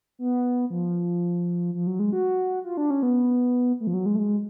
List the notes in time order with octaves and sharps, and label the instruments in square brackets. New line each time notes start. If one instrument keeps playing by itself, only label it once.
[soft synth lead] B3
F3
F3
F#3
G#3
F#4
F4
D4
C#4
B3
A3
F3
F#3
G#3
A3
G#3